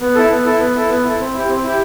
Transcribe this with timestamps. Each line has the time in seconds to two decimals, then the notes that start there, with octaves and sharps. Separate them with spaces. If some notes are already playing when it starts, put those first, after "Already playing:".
0.01 B3
0.15 E4 A4
0.30 B3
0.46 E4 A4
0.60 B3
0.75 E4 A4
0.89 B3
1.04 E4 A4
1.20 C4
1.33 E4 G4
1.48 C4
1.64 E4 G4